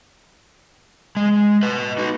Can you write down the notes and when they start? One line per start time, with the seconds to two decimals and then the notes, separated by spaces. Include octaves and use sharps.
1.17 G#3
1.63 B4 D#5
1.98 D#4 F#4